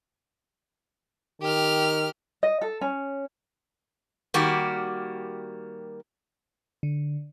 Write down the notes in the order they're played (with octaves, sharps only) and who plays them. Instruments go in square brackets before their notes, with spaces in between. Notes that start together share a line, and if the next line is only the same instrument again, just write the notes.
[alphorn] D#3 [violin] G4 F6
[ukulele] D#5
A4
C#4
[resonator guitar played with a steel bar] D#3 G3 A#3 F#4 G4
[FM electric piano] D3